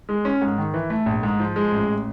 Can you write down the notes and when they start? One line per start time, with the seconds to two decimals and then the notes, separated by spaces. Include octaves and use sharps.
0.09 G#3
0.25 C#4
0.42 G#2
0.58 D#3
0.74 E3
0.90 A3
1.06 A#1
1.23 G#2
1.40 F3
1.56 G#3
1.72 A1